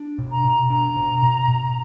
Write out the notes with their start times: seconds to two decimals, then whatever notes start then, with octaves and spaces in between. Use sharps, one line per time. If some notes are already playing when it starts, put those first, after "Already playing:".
Already playing: D4
0.19 B2
0.32 A#5
0.45 B2
0.70 D4 A#5
0.96 B2
1.23 B2
1.48 B2